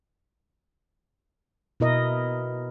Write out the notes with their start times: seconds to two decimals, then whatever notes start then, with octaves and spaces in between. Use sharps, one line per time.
1.80 B2 E4 A#4 D#5